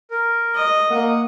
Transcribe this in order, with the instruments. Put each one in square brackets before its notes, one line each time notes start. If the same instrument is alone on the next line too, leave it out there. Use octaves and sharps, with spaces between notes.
[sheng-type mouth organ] A#4
[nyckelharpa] D#5
[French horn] A#3 [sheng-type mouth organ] F#5 D#6